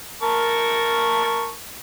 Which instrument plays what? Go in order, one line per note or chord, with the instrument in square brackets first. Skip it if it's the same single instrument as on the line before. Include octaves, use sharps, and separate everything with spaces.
[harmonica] A#4 A5 C#6